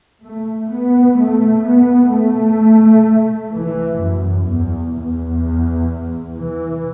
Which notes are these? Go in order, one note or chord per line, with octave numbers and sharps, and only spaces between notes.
A3
B3
A3
B3
A3
E3
F#2
E2
E2
E3